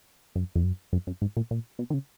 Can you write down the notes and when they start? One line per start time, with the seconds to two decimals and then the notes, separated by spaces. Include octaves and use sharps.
0.35 F#2
0.55 F2
0.64 F#2
0.93 F#2
1.07 F#2
1.22 G#2
1.37 A#2
1.51 A#2
1.79 B2
1.90 D#3
1.94 C#3